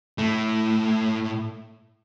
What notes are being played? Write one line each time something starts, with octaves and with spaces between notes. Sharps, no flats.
A2 A3